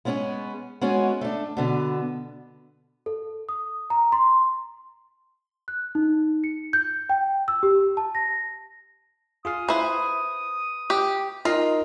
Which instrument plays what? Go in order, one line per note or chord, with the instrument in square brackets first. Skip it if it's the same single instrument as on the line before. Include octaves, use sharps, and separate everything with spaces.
[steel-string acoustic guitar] G#3 B3 C#4 E4 G#4
G#3 B3 C#4 F#4
A3 D4
B2 D3 B3
[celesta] A4
D#6
A#5
C6
F#6
D#4
C#7
G6
G5
E6
G4
A5
A#6
[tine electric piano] F4 G#4 F5 [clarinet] D#6
[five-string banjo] E4 C5 [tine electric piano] B4
[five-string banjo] G4
[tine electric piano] D#4 A#4 D#5 [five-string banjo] F4